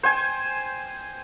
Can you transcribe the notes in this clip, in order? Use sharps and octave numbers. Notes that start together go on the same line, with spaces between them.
C5 G5 G#5